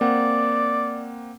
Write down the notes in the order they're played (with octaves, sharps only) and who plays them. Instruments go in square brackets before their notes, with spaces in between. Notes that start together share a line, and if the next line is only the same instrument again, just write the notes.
[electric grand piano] A#3 C4 F#5 [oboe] D5